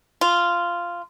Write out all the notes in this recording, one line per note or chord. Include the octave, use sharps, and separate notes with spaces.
F4